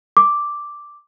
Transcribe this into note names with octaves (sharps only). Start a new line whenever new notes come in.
D6